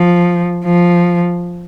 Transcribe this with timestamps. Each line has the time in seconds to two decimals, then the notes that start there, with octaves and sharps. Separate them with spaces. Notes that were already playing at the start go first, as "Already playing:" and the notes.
Already playing: F3
0.65 F3